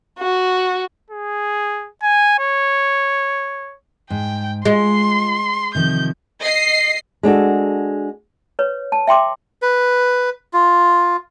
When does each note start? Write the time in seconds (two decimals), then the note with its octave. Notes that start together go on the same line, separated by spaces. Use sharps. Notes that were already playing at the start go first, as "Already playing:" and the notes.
0.19 F#4
1.11 G#4
2.03 G#5
2.39 C#5
4.10 G#2 G5
4.65 G#3 F4 C6
5.75 C3 D#3 F3 G6
6.40 D#5 C7
7.23 G#3 D4 F#4 A4
8.59 B4 C#5
8.92 A5
9.07 E5 G5 C6 D6
9.62 B4
10.53 F4